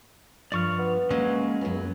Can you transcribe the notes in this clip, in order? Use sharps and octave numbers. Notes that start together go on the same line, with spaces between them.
G2 F3 D5 C#6 F6
B3
F#3 G#3 A#3 C#4 G#5
C#2 F#2 B3